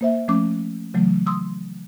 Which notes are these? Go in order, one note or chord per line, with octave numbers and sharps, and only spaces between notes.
A#3 C5 E5
F3 A3 C#4 D6
C#3 E3 F#3 A3
C6 D#6 E6